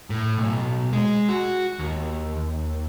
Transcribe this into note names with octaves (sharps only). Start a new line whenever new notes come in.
A2
B1
G#3
F#4
D#2